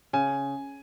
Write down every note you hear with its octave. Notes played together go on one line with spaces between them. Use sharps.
C#3 G#5